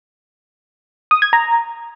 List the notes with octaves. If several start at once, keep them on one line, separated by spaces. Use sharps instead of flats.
D#6
G#6
A#5